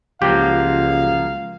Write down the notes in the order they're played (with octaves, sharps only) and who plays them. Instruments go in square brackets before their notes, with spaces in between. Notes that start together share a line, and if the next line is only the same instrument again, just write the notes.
[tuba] C#2 [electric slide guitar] F3 F#3 A#3 [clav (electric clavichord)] G4 [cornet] F5